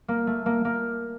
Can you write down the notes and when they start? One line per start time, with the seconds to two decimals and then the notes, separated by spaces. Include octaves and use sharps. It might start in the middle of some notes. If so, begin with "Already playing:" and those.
0.08 A#3
0.27 A3
0.46 A#3
0.65 A#3